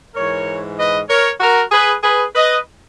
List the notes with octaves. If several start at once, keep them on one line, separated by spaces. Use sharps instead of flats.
G#2 E3 A#4 C#5
B4 D#5
A#4 C#5
F#4 A#4
G#4 B4
G#4 B4
B4 D#5